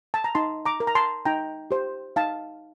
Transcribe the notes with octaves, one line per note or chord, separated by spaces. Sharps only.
A5
A#5
D#4 A5 C6
A#5 D6
A#4
A#5
A5 C6
D#4 G5 A#5
G4 C5
D#4 F5 A5